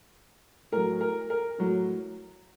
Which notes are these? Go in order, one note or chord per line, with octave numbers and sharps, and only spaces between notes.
A2 F#3 A#4
A#4
A#4
A2 F#3